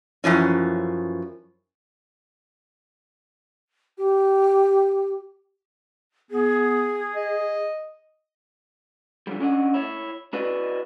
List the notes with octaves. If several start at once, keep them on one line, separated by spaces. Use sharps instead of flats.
F#2 E3 F3 C#4
G4
B3 G#4
D#5
D3 F3 G3
C#4 D4 D#5 F#5
E4 C#5 E5
E4 F#4 B4 D5 D#5